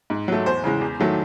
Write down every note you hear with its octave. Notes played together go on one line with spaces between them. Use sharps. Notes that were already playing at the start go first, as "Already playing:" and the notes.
G#2
F#3 A3
E2 C5
C#3 E3 G#3
E2
D#3 F#3 A3